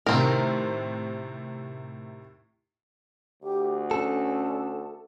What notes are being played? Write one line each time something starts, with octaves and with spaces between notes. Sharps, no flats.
A2 C3 D#3 C4 A#4
D2 G4
C#4 A4